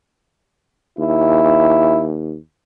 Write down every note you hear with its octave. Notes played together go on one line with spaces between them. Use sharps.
D#2 E4